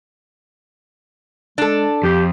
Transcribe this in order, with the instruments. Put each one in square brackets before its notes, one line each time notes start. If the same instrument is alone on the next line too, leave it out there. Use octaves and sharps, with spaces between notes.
[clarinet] G#3 [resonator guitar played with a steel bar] D4 A4
[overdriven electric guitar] F2 [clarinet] G4